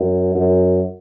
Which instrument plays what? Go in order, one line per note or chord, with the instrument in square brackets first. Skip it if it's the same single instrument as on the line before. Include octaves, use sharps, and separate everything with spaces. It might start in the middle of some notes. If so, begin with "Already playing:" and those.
Already playing: [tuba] F#2
F#2